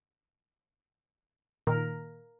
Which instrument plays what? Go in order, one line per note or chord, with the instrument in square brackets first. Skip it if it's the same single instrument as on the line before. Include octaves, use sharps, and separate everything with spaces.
[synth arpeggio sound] A#2 D#3 [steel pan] A#4